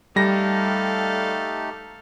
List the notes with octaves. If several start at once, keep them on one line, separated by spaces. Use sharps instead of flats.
G3 A3 D#4 G4 A4 F5 A#6